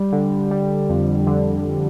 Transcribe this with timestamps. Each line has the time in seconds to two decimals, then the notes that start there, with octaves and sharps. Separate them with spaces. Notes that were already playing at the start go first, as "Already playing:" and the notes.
Already playing: G3
0.12 D3
0.51 G3
0.89 F2
1.27 D3